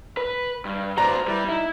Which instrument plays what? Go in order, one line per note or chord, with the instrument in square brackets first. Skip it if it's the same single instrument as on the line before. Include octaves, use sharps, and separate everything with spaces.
[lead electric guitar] B4
G2
[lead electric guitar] F#4 C5 [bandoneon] B4 D5 [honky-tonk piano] A#5
[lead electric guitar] G3 [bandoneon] E4 B4 D5
[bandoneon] D#4 [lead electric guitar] E4